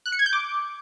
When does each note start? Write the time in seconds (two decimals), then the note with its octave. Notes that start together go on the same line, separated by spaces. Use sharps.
0.06 F#6
0.12 C#7
0.19 G#6
0.26 G6
0.33 D6